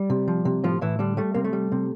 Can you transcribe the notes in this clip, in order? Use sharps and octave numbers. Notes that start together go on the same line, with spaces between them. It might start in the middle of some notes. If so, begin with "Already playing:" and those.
Already playing: G3
C3
F3
C3
A2 F3 F4
A2 E3 E4
D3 G3 D4
G3 A3
C3 A#3
A3
G3
C3